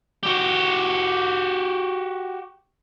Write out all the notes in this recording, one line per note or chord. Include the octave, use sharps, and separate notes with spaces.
F#4 G4